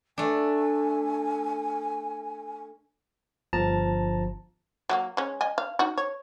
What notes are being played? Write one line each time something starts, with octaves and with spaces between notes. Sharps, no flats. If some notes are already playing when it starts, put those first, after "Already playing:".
A3 D4 G#5
G1 F3 A5 A#5
F#3 A3 A#3
G#3 C#4
D#5 G#5
F5
D#4 F#4
C#5